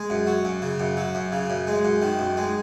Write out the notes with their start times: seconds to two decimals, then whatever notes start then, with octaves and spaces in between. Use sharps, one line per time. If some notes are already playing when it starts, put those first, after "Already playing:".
Already playing: G#3
0.10 F#2
0.27 F#3
0.45 F#2
0.62 C#3
0.80 F#2
0.97 F#3
1.15 F#2
1.32 C#3
1.50 F#2
1.67 G#3
1.85 F#2
2.02 D#3
2.19 F#2
2.37 G#3